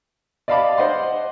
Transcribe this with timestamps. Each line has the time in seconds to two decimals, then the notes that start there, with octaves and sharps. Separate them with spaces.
0.48 D5 D#5 F5 A5 B5 D6
0.77 C5 D#5 F#5 C6